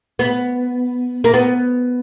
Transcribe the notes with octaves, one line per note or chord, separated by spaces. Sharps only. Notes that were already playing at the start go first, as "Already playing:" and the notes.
B3
A#3
B3